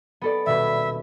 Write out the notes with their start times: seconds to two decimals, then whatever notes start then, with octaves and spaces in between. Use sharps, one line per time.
0.21 B3 A4 D5
0.46 D#1 B2 B4 E5